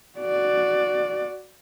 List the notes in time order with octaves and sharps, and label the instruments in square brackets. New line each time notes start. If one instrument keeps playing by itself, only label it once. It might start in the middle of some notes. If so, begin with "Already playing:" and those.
[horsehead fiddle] F#4 D5